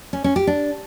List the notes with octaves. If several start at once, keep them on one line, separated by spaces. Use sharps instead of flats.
C#4
C#4
G4
D4